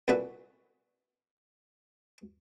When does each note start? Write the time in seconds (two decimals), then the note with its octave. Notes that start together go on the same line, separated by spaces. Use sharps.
0.08 C2 A#2 D3 F#4 B4 E5